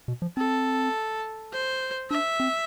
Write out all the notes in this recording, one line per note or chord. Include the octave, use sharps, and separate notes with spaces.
B2
F3
C4 A4
C5
D4 E5
C4